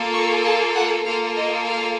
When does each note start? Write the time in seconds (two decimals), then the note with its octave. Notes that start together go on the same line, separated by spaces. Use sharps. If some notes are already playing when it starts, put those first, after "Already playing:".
Already playing: A#3 F4 A4
0.14 C#6
0.44 A5
0.74 F#5
1.05 A#3 F4 A4 F5
1.36 D#5
1.67 F5